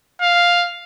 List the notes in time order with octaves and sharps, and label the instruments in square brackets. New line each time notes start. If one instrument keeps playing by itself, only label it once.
[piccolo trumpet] F5